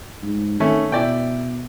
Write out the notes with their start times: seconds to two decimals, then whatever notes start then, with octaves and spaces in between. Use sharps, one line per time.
0.23 G#2
0.60 D#3 A3 C#4
0.92 B2 E4 D5 G5